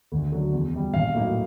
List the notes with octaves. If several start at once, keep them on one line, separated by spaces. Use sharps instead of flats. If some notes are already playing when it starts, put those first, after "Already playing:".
D2
D3 F#3
E2
B2 G3
A#1 F5
A2 F#3 A#3 D#4